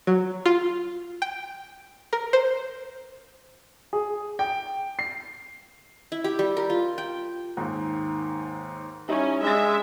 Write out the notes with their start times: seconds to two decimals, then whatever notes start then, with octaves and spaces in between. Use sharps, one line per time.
0.07 F#3
0.46 F4
1.22 G5
2.13 A#4
2.33 C5
3.93 G#4
4.39 G5
4.99 C7
6.12 E4
6.24 G4
6.39 G3
6.57 A#4
6.70 F4
6.98 G5
7.57 D#2 G#2
9.09 G3 C#4 D#4 E4
9.43 G#3 D4 E5 A6